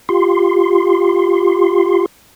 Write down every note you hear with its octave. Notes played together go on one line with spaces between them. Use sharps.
F4 G4 C6